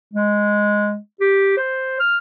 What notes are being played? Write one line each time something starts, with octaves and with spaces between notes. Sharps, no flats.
G#3
G4
C5
F6